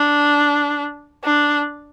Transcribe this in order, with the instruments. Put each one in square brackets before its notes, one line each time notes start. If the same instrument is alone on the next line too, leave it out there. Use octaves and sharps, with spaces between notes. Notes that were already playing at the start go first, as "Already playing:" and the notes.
Already playing: [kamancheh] D4
D4